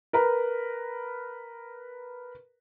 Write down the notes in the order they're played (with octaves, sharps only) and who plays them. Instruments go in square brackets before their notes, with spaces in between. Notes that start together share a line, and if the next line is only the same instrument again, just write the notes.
[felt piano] A#4 B4 A#5